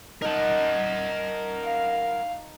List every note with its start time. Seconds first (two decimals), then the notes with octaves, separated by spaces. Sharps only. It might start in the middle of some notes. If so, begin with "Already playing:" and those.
0.22 D#4 A#4 F#5 A5
1.64 F5